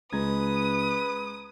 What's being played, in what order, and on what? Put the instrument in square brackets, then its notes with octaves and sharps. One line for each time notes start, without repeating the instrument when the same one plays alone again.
[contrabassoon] C#2 [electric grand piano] G#3 A#5 G#6 [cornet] B4 [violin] D#6